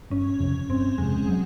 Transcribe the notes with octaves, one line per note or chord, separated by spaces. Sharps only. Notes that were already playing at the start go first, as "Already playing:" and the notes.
G1 C#4
F2 C3 F3
G1 C4
F2 C3 F3 G#3
F#3